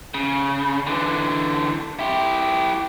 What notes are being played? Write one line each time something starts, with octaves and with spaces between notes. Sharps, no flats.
C#3
D3 E3
E4 G4